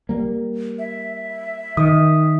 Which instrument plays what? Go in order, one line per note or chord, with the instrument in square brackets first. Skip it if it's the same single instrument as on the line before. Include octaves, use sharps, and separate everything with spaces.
[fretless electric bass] G3 A#3
[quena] E5
[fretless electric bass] D#3 [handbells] D#6